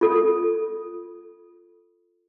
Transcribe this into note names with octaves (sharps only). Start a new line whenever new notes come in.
F4 A4